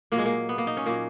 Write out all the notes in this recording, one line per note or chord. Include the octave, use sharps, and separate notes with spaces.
A#2 F#3 A#3
G#3
A#3
B3
A#3
D#4
C#4
A#2 F#3 A#3